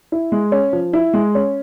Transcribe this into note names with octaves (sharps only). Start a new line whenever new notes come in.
E4
G#3
C#4
F3
E4
G#3
C#4